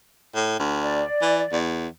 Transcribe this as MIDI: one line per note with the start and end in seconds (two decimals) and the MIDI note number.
0.35 0.59 45
0.59 1.02 38
0.82 1.58 74
1.22 1.42 52
1.53 1.87 40